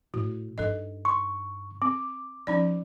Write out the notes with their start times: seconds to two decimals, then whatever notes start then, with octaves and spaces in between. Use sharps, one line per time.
0.14 A2 F#4
0.58 G2 D#4 A4 D#5
1.05 C6 C#6
1.82 C4 D6
2.47 F3 C#4 D#4 D5